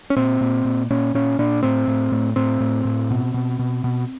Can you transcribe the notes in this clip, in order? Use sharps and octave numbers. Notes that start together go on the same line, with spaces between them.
C#4
A#2 C4
A#2
A#2
A#2 C#4
A#2 C#4
A#2 D4
A2 C4
A2
A2
A2 C4
A2
A2
B2
B2
B2
B2